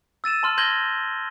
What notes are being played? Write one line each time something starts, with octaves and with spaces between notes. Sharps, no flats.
E6 A6 D#7 E7
A5 C6 F6
C6 G6 G#6 A#6 F#7 G7